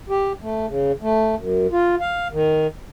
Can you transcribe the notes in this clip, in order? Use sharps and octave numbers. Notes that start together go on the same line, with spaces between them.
G4
A3
C#3
A3
F#2
F4
F5
D#3